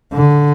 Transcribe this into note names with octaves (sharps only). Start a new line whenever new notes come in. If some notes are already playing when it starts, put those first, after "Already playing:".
D3